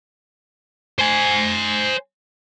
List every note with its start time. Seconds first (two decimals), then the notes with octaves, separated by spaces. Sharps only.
0.99 C5 G#5